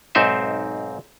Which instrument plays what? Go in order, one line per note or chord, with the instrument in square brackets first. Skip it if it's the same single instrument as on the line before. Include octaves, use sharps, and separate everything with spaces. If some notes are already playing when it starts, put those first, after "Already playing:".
[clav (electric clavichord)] B1 G#2 C4 D#4 C5 E5